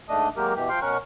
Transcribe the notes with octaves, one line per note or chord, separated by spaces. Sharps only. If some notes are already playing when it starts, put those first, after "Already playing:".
G#2 A3 D4 D#5 D#6
F#3 G#3 A#3 G4 A#4
B2 E3 G4
F3 F5 G5 C6
B2 C#4 A#4 F#5 C#6